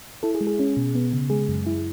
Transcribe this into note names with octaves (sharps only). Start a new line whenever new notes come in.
E4 A4
G#4
G#3
G#4
C#4
B2
B3
C#3
G#3 G#4
F#2
E4